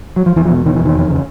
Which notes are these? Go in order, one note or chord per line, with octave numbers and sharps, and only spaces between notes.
F#3
F3
E2 E3
F3
B2
B2 D#3
E3
E2 D#3
F2
C#3